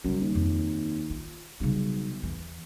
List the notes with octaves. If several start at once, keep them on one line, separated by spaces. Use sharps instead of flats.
F#2 C#3 G3
D#2
F2
F4
B1 C#3 G3
E2 E3